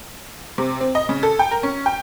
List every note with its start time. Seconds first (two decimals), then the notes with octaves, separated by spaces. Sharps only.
0.58 C3
0.81 C4
0.95 D#5
1.09 C#3
1.23 A4
1.39 G5
1.51 A#4
1.63 C#4
1.86 G5